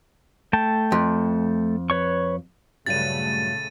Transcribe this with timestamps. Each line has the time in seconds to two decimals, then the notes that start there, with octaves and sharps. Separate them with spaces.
0.53 A3 G5 A5
0.92 F2
1.90 B4 C#5 C#6
2.86 A#1 G2 C#3 F#3 G3 A3 A6 D#7